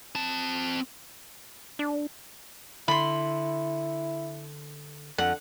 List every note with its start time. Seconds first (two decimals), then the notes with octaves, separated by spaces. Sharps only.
0.15 C4 A5
1.79 D4
2.88 D3 E4 B5 C6
5.18 F2 D3 F#5